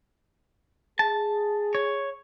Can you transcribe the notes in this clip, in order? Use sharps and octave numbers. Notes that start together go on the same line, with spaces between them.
G#4 A5
C#5